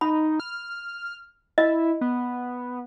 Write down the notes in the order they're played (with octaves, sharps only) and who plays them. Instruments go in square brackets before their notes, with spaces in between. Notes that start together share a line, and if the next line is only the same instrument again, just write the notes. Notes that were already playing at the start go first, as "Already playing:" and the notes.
[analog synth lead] D#4 [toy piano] B5
[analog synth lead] F6
[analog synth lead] E4 [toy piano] D#5
[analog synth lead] B3